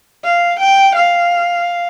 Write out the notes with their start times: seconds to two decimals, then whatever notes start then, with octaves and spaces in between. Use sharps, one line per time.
0.24 F5
0.60 G5
0.95 F5